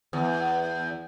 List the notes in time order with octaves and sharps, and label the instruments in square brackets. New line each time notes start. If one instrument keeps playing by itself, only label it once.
[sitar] E2